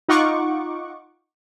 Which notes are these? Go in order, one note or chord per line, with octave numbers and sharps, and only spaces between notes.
D#4 F4 F#5 C#6 D6